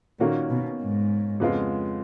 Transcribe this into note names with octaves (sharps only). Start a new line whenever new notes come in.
A#2 D#3 A#3 C#4 F#4
B2
G#2
F2 C#3 G#3 B3 F4